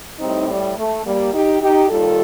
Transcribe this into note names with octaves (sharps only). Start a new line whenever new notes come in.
A2 G3 C4 D#4
G3
A3
G3 A#3
D#4 G4
D#4 G4
D#2 D#3 G3 F4 A4